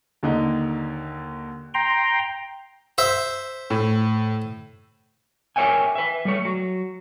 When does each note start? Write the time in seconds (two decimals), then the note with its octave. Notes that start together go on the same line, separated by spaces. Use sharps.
0.23 D#2 D3 D#4
1.74 G5 A#5 C6
2.98 C5 E5
3.70 A2
5.56 G4 A#4 C#5 E5 G5 G#5
5.95 B4 E5
6.25 G3 A3 C#5
6.45 F#3